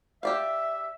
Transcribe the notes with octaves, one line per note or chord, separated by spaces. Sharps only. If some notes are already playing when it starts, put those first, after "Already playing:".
G4 D5 E5 F5